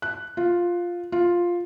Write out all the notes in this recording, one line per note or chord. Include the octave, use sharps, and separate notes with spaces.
F#6
F4
F4